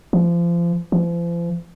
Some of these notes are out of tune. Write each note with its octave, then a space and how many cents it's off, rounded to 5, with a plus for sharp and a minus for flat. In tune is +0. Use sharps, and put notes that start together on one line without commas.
F3 -30
F3 -40